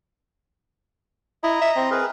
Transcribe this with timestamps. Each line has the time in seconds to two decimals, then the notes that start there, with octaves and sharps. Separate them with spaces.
1.44 E4 D#5 A#5
1.61 E5
1.76 C4
1.91 G#4 A#4 B4